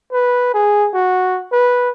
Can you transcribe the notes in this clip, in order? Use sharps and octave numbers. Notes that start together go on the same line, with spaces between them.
B4
G#4
F#4
B4